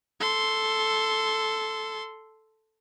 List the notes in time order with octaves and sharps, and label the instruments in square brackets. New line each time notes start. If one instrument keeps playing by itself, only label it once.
[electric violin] A4 C6